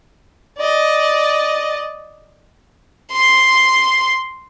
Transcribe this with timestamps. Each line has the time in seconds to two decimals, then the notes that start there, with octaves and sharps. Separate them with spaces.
0.57 D5 D#5
3.13 C6